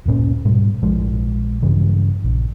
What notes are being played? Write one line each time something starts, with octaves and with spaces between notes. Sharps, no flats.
D1 G1 A#2 C#4
G#2 B2 G3
A#1 F3 G#3
G2 C#3 E3
A#1